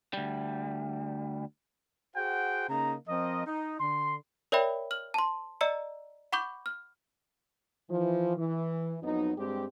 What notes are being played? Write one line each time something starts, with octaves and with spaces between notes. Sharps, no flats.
D2 G3
F#4 G#4 C5 F#5 G5
C#3 A#3 D#4 A#5
F3 C4 A#4 D#5
D#4
D3 C6
A#4 C#5 D5 E5 G5 B5
F6 F#7
A5 C6
D5 D#5 A#5 E6 C#7
F#5 B5 C#6 D6 G6
F6
E3 F3
E3
F2 F#3 B3 D#4
G2 G#3 C4 G4